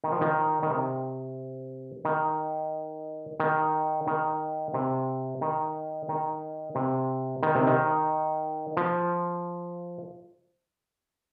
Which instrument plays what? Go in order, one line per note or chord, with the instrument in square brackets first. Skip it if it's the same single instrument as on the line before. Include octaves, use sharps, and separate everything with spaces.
[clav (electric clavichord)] D#3
F3
D#3
D#3
C3
D#3
D#3
D#3
C3
D#3
D#3
C3
D#3
C3
D#3
F3